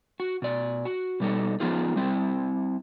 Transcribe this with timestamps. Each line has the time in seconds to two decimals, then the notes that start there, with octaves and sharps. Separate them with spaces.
0.20 F#4
0.42 B2 D5
0.85 F#4
1.20 B2 G3 D#4 A4
1.60 F3 B3 D#4 F4 G#4
1.96 G3 C4 E4